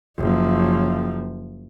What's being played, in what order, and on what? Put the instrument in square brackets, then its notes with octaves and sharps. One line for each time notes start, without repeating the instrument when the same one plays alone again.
[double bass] F#1 F3